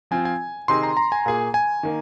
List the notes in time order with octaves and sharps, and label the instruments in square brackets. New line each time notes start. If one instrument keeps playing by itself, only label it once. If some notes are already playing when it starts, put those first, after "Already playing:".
[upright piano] F3 C4 F4 [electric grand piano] G#5
[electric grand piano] G#5
[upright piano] C3 D#3 C4 D#4 G#4 [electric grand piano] C6
[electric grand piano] A#5
A#5
G#5
[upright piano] A#2 A#3 G#4
[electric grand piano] G#5
[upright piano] D#3 A#3